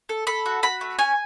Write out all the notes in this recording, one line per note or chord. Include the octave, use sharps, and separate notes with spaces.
A4
A4 B5
F#4
F#4 B5
A3
C#4 G#5